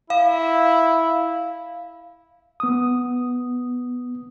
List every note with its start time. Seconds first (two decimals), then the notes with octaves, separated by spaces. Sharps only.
0.10 E4 F5
2.60 B3 D#6